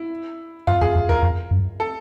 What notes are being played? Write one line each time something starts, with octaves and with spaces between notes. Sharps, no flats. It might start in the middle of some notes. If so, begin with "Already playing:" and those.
Already playing: E4
F#2 F4
F2 G#4
F2
E2 A#4
F2
F#2
A4